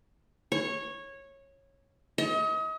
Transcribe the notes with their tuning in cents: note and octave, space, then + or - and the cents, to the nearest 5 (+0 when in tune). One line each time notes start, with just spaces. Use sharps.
C#5 -15
D#5 +35